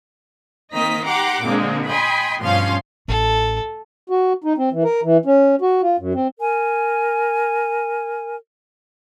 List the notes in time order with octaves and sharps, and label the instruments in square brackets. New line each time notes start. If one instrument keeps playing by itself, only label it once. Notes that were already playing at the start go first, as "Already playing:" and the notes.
[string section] D#3 A#3 C4 D#5 A#5 B6
G4 F#5 A#5 C6 D6
A#2 D3 G#3 A#3 C4
D#5 G5 G#5 B5 C6
G2 B2 F3 C#4 F5 C6
[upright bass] A1 [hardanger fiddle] A4
[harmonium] F#4
D#4
C4
E3
A#4
E3
C#4
F#4
F4
F#2
C4
[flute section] A#4 G#5